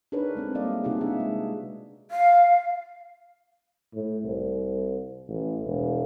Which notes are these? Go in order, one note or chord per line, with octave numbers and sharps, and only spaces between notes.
D4 D#4 G#4 A#4 B4 C#5
G#3 A3 C4
G3 A3 A#3 D5 D#5 F5
C3 D#4 F4 F#4 G#4
D4 G#4 E5 F#5
G#3
F5
A2
C2
A1
E1